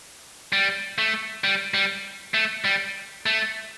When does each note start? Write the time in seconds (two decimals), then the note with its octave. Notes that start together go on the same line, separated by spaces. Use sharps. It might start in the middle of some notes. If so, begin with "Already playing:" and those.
0.53 G3
0.98 A3
1.44 G3
1.74 G3
2.34 A3
2.65 G3
3.26 A3